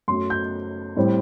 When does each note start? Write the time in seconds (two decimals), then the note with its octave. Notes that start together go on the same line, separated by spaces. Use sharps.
0.08 F#2 F#3 A3 C6
0.30 G6
0.96 A2 G3 C4